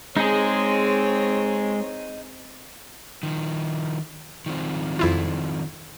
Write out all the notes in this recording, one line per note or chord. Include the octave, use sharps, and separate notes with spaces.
G#3 C4 D#4 G#4 C#5
D#3 F3
D#3 F3 C4
F2 E4 F4